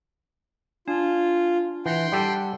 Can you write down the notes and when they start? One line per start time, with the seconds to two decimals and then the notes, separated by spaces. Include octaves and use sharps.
0.88 D4 F4 G#5
1.86 E3 F#5 G5 C6
2.12 G3 G4 A4